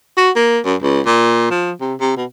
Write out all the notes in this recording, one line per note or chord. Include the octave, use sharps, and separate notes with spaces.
F#4
A#3
F#2
C#2
A#2
F3
C3
C3
B2